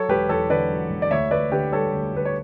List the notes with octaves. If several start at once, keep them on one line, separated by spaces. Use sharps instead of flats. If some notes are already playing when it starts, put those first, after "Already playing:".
Already playing: F#3 A4 C#5
E1 G4 B4
E2 A4 C#5
D3 B4 D5
F#3
E1
D5
D2 C#5 E5
D2 B4 D5
D3 G4 B4
G3 A4 C#5
D2
D2 B4
C#5